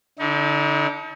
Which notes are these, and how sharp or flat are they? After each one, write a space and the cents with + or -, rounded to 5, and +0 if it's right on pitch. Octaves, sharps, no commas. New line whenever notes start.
D3 -15 D#4 +40